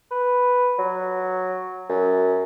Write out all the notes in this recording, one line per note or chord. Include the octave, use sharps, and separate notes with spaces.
B4
F#3
F#2